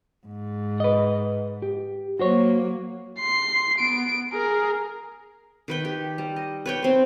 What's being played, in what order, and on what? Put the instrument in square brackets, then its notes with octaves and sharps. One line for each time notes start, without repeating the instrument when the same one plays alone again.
[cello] G#2
[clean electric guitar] B4 D#5
G4
[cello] F#3 A#3 [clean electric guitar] F#4 C5 C#5
[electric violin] C6 C7
B3 D7
G#4 A#4
[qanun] D#3 B4 G5
G4
G3
D#5
B4 C#5 G5
C4 C5